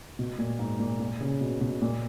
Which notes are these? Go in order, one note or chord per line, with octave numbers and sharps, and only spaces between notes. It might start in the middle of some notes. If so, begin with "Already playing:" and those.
B2
A#2
G#2
A#2
A#2
C#3
B2
B2
A#2